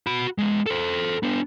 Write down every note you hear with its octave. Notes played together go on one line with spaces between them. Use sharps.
F#4 B5
G#3 B3
A4 C5
B3 D4